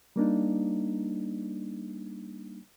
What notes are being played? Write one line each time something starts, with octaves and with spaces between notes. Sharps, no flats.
G3 A#3 D4 D#4